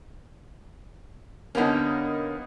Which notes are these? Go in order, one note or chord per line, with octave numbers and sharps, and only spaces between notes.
D3 G3 A#3 B3 C#4 D#4